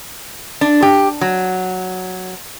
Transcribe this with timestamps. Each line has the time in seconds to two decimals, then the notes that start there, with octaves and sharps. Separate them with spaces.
0.61 D4
0.82 G4
1.21 F#3